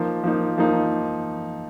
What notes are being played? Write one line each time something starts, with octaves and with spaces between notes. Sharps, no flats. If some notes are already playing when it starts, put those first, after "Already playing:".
Already playing: F3 A#3 D#4
F3 A#3 D#4
F3 A#3 D#4